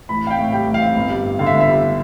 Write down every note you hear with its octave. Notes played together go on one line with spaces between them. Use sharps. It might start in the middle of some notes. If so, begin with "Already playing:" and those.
A1 B5
C4 F5
G5
A2
G3 G5
A1
F5
C4
G1
G3
G2
D3 F5
E5
G1
E5
G3